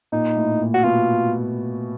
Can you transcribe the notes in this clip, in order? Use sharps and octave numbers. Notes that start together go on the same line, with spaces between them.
A#2 D#4
A2
A#2
F#4
B2 F4